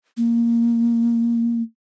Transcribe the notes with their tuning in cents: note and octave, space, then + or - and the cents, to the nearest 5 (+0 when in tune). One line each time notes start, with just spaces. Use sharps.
A#3 +0